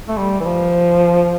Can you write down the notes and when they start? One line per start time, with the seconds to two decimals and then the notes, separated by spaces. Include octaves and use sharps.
0.08 A3
0.17 G3
0.40 E3
0.44 F3